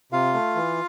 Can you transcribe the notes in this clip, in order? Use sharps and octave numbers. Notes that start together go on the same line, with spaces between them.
C3 F4 F5
A3
E3